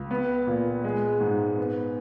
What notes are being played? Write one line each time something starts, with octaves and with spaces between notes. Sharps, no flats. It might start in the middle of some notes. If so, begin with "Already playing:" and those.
Already playing: C#2
B3
A#2
G#3
G#2
B3